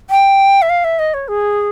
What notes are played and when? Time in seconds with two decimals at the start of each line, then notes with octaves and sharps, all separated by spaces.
0.10 G5
0.62 E5
0.69 F5
0.84 E5
0.99 D#5
1.14 C#5
1.28 G#4